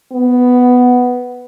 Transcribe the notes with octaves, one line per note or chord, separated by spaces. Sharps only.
B3